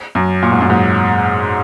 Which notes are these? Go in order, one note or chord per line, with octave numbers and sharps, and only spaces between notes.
F#2
A#2
G#2
F#2
G#2